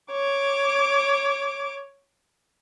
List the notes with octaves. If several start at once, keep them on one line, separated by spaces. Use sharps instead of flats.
C#5 D6